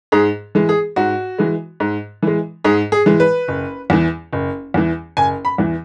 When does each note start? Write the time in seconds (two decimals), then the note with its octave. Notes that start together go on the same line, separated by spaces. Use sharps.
0.12 G#2 G#4
0.55 E3 G#3
0.69 G#4
0.96 G#2 F#4
1.38 E3 G#3
1.80 G#2
2.23 E3 G#3
2.64 G#2 G#4
2.92 G#4
3.06 E3 G#3
3.20 B4
3.48 F#1
3.90 E2 E3
4.33 F#1
4.74 E2 E3
5.17 F#1 G#5
5.45 B5
5.58 E2 E3